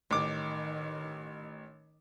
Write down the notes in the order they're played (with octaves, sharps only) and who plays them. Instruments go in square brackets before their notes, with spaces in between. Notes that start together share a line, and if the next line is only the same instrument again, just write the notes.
[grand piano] A1 D6 [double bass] D#3